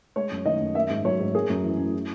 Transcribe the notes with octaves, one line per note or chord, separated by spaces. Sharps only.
G#3 C#5
F#2
D#3 D#5
F#2
A#3 E5
G#2
F#3 C#5
G#2
A#3 G#4
F#2
E3
F#2
E4